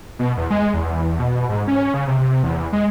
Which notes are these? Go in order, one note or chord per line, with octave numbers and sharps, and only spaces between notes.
B2
E2
G#3
E2
B2
G#2
C#4
C#3
C3
C3
E2
G#3